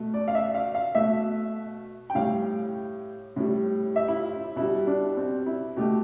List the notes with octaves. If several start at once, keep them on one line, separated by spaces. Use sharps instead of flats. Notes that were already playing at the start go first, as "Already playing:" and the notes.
Already playing: B2 A3
D5
F5
E5
F5
F5
B2 A3 E5
G5
A2 G3 F5
A2 G3
E5
E4
F4
E4
B2 G3 E4
D4
C4
E4
B2 A3 G4